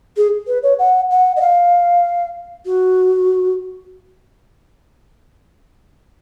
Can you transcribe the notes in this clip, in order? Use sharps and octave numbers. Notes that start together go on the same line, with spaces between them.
G#4
B4
C#5
F#5
F#5
D#5
F5
F#4